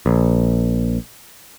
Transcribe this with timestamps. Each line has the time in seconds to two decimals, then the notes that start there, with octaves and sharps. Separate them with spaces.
0.06 A#1